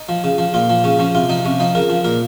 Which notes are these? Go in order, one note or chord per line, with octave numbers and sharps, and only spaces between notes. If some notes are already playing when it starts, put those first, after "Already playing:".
Already playing: D#4
F3
C#3
F3
A#2 F4
F3
C#3 C#4
F3 C#4
C3 F4
F3 D#4
C3 C#4
F3 D#4
C#3 A#4
F3
A#2 A#4